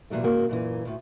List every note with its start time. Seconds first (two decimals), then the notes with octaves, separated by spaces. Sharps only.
0.10 A#2 E3 F#3 G3 A3
0.24 G#2 C#3 A#3 F#4
0.49 F#2 A#2 E3
0.85 D2 A2